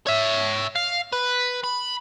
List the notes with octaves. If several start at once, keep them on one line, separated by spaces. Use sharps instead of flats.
C#5 E5
F5
B4
B5